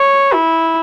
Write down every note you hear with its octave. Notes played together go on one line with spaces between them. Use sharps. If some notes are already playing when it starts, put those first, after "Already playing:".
Already playing: C#5
E4